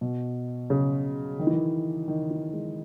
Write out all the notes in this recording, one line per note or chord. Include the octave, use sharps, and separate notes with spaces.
B2
C#3
D#3
E3
D#3
D#3
E3
G#3